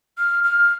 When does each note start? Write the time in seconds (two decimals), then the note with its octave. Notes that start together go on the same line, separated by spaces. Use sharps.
0.18 F6
0.44 F6